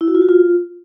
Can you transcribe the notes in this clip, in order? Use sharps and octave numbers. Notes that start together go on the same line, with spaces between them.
E4
F#4
F4
F#4
F4